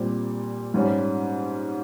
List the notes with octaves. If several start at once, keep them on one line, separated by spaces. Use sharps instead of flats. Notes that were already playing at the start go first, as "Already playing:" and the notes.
Already playing: A#2 G3 C4
G#2 G3 C#4